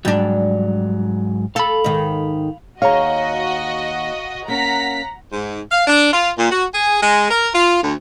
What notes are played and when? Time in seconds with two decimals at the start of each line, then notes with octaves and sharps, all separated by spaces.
0.05 G#2 F#3 G3 D4
1.56 A4 F5 B5
1.84 G#2 D#3
2.82 D#2 F#4 G#4 C#5 D#5 F5 A#5
4.48 A#3 C#4 F#5 A#5 B6
5.32 G#2
5.71 F5
5.87 D4
6.13 F4
6.38 A#2
6.51 F#4
6.73 G#4
7.01 G#3
7.31 A#4
7.54 F4
7.83 D2